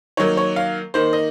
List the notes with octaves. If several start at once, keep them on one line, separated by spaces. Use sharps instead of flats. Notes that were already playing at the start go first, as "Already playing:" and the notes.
D#3 F#3 A#3 C#5
C#5
F5
D#3 A#3 C5
D#5